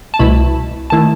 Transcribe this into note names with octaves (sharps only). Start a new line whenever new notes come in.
A5
C2 B2 A3 E4 B5
D#3 A3 E4 A5